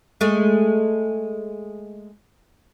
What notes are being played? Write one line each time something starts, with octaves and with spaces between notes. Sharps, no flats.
G#3 A3